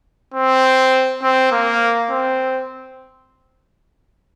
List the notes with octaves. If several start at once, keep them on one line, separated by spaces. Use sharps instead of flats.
C4
C4
A#3
C4